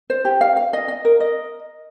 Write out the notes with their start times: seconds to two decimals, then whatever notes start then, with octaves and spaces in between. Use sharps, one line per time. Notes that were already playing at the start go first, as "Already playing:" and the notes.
0.10 C5
0.25 G4
0.41 F5
0.57 F5
0.73 D#5
0.88 D#5
1.05 A#4
1.20 D#5